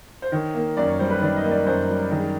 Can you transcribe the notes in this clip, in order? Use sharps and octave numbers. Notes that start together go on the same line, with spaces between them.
C5
D#3 C#5
A#3
F#2 D5
C#5
G3 C5
B4
D#3 D5
D#5
A#3
D5
F#2 C5
G3
D#3 G#4